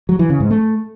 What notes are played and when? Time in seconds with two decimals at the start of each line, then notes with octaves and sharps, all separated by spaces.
0.09 F#3
0.19 E3
0.30 C#3
0.40 G#2
0.50 A3